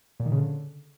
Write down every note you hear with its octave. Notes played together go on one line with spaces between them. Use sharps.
A#2
D#3
C#3
D3